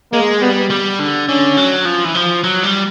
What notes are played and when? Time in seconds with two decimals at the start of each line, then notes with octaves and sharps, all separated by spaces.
0.13 G#3 A#3
0.41 G3 B3
0.70 G3
0.99 D3
1.29 D3 C#4
1.57 F#3
1.85 F3
2.05 E3
2.15 F3
2.44 F#3
2.64 G3